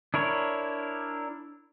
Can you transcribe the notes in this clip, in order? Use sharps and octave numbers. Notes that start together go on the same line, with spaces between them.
D4 E4 A#4 C#5